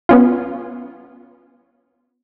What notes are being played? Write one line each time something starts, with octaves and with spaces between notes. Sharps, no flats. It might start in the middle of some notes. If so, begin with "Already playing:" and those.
B3 C#4 F4